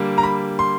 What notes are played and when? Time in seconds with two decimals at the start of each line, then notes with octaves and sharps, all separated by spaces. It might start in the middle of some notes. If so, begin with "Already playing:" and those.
Already playing: D3 G3 A#3
0.18 A#5
0.23 B5
0.59 C6